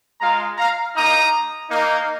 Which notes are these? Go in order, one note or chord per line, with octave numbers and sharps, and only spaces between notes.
G#3 F4 F5 A#5
F5 A#5
A#3 D#4 A#5 D#6
A#3 D#4